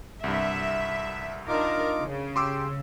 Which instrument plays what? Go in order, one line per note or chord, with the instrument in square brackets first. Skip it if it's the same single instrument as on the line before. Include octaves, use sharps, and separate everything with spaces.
[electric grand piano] C2 G2 [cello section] E5
[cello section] D4 A#4 [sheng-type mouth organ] D#4 F4 D6
[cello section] C#3
[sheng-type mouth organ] G4 [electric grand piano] C6 D6 E6